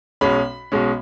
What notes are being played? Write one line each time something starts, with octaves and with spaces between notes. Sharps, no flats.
B1 B2 G#3 C#4 B5
B1 B2 G#3 C#4